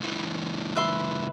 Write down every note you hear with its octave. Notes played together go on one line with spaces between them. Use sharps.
C#2 E3
B4 E5 C6